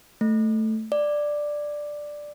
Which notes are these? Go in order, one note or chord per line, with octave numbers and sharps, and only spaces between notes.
A3
D5